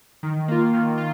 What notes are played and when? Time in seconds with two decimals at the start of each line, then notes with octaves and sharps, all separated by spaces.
0.23 D#3
0.48 A#3 F4
0.73 D#3
0.98 F4